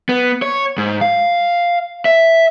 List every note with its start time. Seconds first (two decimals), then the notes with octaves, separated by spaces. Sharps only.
0.09 B3
0.42 C#5
0.78 G#2
1.01 F5
2.05 E5